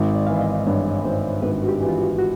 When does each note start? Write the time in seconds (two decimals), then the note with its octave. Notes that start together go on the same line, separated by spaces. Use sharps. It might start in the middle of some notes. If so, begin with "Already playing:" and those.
Already playing: G#1
0.15 D5
0.27 E3 F5
0.33 E5
0.41 D#5
0.67 G2 C#5
1.04 G#1 C5
1.42 G#1 B4
1.62 F#4
1.68 G4
1.81 E3
1.89 F4
1.94 F#4
2.19 F#4